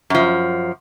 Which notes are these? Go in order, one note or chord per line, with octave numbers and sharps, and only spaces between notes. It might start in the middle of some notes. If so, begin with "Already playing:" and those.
F#2 F3